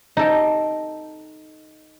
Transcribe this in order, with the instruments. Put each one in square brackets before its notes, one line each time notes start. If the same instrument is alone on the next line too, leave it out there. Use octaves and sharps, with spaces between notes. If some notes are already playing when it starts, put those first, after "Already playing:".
[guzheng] D#4 A4 G5